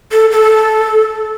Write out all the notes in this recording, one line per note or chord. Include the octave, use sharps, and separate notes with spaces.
A4
A4